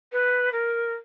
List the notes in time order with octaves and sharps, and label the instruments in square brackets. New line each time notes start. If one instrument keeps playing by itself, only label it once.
[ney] B4
A#4